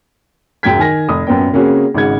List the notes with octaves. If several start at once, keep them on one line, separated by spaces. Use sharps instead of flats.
C#2 F#2 F#3 G5 G#6 B6
D#3 G#5 A#6
F1 D#6
F#2 A#2 B3 C#4 G5
C#3 A#3 C4 C#4 F#4 G#4
G#1 G#2 C#3 F#5 G#6